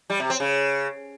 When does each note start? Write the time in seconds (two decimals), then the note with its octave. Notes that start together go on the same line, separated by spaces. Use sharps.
0.10 G3
0.20 C3
0.30 C4
0.40 C#3